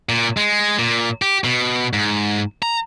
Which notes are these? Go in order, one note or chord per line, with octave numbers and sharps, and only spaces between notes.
A#2
G#3
A#2
G4
B2
G#2
A#5